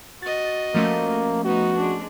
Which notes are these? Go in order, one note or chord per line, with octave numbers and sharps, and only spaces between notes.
F#4 D#5 A6
F3 A3 A#3 C#4
B3 D#4 F#4
G#3 D4